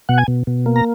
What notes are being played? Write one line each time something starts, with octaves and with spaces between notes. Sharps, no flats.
B2 F#5
G#5
B2
B2
A#3
A#5